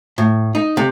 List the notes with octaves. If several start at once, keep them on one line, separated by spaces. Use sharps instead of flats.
A2
D#4
C3